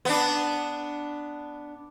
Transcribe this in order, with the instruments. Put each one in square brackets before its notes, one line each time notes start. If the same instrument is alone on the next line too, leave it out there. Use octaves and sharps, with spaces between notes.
[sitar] B3 D4